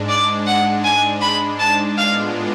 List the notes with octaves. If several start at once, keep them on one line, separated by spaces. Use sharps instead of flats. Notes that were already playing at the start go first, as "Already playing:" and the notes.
Already playing: G#2 G#3 D4
D5
F#5
G#5
B5
A5
A2 G#3 B3 D4 F4 F5